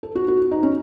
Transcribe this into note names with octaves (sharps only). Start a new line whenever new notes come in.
A4
F#4
F#4
D#4
C#4